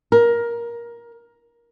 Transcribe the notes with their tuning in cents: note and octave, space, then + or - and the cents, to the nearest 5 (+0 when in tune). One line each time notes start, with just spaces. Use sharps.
A#4 +15